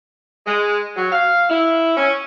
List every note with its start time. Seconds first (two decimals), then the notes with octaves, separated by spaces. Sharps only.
0.46 G#3
0.96 F#3
1.12 F5
1.50 E4
1.97 C#4